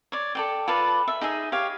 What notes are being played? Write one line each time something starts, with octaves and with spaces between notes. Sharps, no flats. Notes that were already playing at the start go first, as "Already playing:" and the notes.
C#5 D5
A4 D5 G5
F4 A4 B4 D5
E5
D#4 G#4 D#5 E5
G4 C#5 F5